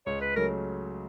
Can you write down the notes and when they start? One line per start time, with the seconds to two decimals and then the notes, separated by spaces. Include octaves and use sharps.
0.06 C#2 C#5
0.21 B4
0.36 C#3 F#3 A3 A#4